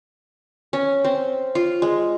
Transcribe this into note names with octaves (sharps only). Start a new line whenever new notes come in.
C#4
C4
F4
G#3